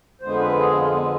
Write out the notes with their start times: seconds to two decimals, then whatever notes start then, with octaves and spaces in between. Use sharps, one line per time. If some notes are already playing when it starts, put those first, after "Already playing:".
0.21 F2 D3 G#3 B3 C5
0.40 B4
0.57 G#4
0.75 F4
0.91 B3